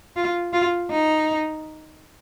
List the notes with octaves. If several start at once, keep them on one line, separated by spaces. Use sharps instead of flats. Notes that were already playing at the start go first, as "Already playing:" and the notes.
F4
F4
D#4